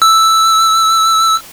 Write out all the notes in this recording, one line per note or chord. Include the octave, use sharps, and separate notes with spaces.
E6